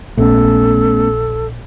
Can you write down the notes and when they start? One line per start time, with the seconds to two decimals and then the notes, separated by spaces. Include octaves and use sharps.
0.18 A#1 A3 B3 C#4 A4